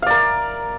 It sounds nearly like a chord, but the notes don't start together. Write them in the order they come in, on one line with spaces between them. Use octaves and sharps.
F5 D5 A#4